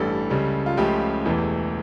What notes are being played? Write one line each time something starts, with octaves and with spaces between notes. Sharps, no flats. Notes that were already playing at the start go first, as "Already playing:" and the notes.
Already playing: A1 G2 E3 G3 A4
C#2 C#3 G3
F4
C#2 C#3 F3 A3 G4
E1 E2 E3 A3